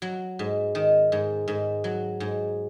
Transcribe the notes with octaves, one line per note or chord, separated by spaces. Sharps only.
F#3
G#2
D#3
G#2
G#2
F#3
G#2